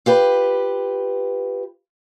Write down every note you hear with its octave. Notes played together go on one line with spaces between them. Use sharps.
F4 G4 B4